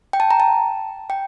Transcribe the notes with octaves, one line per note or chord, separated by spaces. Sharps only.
G5
A5
A#5
A5
G5